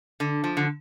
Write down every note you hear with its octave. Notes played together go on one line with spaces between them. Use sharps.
D3
F3
D3